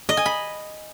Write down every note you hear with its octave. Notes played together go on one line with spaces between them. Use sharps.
D#5
G#5
B5